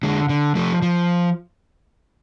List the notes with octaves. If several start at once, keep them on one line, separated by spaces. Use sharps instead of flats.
D3 G#3
D3
F3 A3
F3